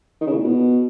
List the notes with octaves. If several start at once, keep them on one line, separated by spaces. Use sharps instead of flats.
D#3
C#3
A2
A#2
B2